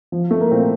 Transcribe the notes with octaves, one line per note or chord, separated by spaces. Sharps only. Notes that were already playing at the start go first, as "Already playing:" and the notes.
F3
A3
A#3
A#2 C4